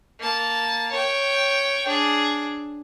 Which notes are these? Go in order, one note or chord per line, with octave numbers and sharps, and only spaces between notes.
A#3 A5
C#5 G5
D4 G#4